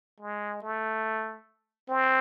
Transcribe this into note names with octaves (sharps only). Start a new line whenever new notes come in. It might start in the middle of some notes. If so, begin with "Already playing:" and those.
G#3
A3
C4